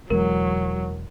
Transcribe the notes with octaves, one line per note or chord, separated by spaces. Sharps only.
E1 E2 F#3 G#3 A#4